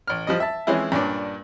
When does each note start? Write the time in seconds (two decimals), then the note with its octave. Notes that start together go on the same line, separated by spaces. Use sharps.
0.07 A1 F6
0.27 F3 G3 D#5
0.40 E5 A5
0.67 E3 F3 G#3 C4 C#4 E4
0.92 G2 A#2 C#4 D4